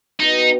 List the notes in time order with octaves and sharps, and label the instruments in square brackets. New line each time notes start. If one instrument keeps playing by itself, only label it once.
[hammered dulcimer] B2 G3 B3 [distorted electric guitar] D#4